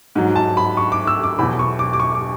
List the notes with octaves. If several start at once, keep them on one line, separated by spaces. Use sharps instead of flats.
G#2 F#3
A5
B5
C#6
D6
E6
D6
E2 B2 F#3 B5
C#6
D6
D6
C#6
D6